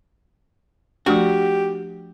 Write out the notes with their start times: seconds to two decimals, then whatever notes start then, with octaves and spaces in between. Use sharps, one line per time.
1.06 F3 A3 D4 F#4 G4